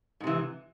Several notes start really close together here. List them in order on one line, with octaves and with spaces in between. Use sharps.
G#2 C3 E3